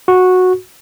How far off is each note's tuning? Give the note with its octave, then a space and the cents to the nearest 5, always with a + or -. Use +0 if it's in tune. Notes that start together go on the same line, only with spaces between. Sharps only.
F#4 -10